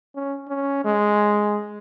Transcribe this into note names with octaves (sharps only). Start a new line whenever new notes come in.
C#4
C#4
G#3